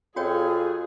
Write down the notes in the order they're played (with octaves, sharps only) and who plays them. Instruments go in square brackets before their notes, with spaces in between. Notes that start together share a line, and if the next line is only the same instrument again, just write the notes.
[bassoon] F2 [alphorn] F4 [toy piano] F#4 C#5 G5 [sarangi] G#4